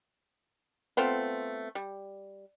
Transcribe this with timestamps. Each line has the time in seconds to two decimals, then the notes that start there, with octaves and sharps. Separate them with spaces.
0.97 A3 B3 C4 F4
1.75 G3